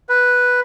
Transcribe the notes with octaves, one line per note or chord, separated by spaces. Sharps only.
B4